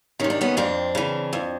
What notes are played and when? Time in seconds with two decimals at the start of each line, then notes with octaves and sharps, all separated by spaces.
0.20 C3 D#3 C#4
0.30 D4
0.41 B3 C#4
0.57 F2 C4 D4
0.95 C#3 E3
1.33 F2